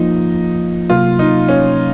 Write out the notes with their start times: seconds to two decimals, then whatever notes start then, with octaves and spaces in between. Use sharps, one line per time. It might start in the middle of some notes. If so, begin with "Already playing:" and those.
Already playing: F3 A#3 D#4 F4
0.90 C3 F#3 A#3 F4
1.19 D#4
1.48 C#4